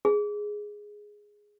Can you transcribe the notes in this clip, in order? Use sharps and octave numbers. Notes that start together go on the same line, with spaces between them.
G#4